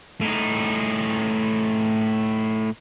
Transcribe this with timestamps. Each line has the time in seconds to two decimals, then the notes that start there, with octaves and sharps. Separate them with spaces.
0.21 A2 D#4